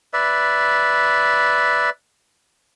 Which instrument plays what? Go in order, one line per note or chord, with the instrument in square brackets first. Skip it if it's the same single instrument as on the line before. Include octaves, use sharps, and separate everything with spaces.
[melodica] B4 D5 E5